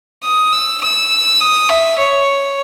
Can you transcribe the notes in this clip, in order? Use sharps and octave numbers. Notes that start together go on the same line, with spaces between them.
D#6
E6
E6
D#6
E5
C#5